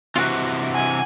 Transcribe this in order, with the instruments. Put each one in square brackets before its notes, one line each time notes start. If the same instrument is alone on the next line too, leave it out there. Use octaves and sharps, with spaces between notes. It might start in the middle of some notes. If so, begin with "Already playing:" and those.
[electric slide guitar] C3 E3 [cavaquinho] F4 F#4
[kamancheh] F#5 G#5